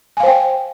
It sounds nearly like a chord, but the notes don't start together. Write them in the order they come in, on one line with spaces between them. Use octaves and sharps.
G#5 F5 C5 G5